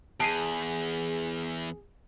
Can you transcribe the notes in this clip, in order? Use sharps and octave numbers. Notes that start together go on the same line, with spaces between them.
E2 G#4 A5 C7 D#7